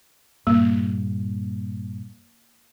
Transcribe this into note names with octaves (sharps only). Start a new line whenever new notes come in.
G2 A#2 A#3